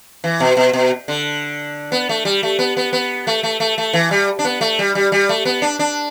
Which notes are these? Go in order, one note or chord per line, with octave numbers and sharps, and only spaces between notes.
E3
B2
B2
B2
D3
B3
A3
G3
A3
B3
B3
B3
A3
A3
A3
A3
E3
G3
D4
B3
A3
G3
G3
G3
A3
B3
D4
D4